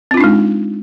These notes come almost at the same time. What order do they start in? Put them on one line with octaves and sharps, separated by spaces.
C4 F4 D4 D#4 G#3